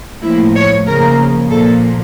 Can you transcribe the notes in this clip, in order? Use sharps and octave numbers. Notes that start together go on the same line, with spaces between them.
A2 F3 A#3 E4
C#5
C#3 F3 A#3 A#4
A#2 F3 A#3 A4